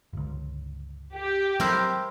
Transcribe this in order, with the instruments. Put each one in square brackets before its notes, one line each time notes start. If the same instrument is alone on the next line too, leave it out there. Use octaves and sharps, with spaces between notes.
[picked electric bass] G1 C#2
[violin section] G4
[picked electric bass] F#3 G3 C4 [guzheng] E4 A#4 C5